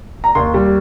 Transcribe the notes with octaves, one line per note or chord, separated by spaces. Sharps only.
A#5
D#2 C6
G3